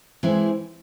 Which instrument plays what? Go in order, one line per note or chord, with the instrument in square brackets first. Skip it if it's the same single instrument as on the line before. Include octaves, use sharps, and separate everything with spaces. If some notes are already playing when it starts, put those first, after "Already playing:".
[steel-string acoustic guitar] E3 G#3 C4 E4 G#4